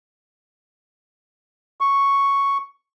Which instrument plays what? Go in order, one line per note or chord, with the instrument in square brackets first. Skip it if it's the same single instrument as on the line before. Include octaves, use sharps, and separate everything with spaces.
[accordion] C#6